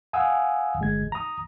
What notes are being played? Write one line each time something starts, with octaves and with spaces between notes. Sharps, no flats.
F5 F#5 G#5 D#6 E6
G1 G#3 G#6
A#5 D#6